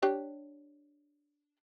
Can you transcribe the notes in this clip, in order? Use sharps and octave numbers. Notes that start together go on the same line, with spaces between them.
D4 G4 C#5